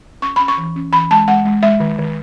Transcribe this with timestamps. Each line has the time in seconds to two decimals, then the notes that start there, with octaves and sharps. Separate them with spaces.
0.22 C#4 C#6
0.36 C#4 B5
0.48 C#6
0.57 E3
0.76 C#4
0.93 E3 B5
1.11 G#3 A5
1.28 G#3 F#5
1.45 G#3
1.63 G#3 E5
1.80 D#3
1.98 D#3